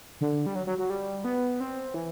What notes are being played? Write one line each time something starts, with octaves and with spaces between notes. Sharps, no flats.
D3
G3
F#3
F#3
F#3
G3
B3
C4
E3